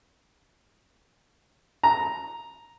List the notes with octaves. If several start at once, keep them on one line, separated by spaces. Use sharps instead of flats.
A#5